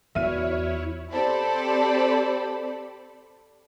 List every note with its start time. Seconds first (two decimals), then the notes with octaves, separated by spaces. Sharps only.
0.15 E2 E4 F#4 C#5 D5 E5 F6 D#7
1.12 C4 G4 A4 C5 D5 B5